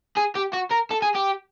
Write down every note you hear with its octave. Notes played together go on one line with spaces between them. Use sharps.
G#4
G4
F#4
A#4
A4
G#4
G4